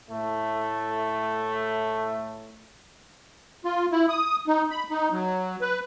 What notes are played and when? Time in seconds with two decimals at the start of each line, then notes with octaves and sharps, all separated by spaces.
0.11 A2 A3
3.65 F4
3.92 E4
4.09 D#6
4.47 D#4
4.71 B5
4.90 D#4
5.12 F#3
5.61 B4